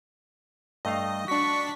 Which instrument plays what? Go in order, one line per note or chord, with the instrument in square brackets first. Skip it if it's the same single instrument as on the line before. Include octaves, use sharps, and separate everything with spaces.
[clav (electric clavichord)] G2 A3 F5 [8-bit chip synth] D#5
[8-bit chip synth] D4 B6 [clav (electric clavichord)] F#4 [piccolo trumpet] C#6